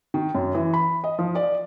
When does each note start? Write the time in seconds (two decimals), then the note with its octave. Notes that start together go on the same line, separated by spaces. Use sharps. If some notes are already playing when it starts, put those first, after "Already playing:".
0.14 D#3
0.35 F#2
0.55 E3
0.74 B5
1.04 D#5
1.19 F3
1.35 D5